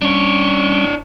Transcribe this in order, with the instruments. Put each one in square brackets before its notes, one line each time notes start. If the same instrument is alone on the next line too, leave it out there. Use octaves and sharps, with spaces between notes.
[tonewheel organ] G3 C#4 [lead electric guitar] D4 C#5